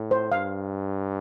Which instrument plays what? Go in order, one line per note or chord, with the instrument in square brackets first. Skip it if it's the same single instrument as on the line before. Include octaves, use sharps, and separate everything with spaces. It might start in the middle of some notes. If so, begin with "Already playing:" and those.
Already playing: [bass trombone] A2
[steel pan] C5
[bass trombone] G2 [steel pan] F5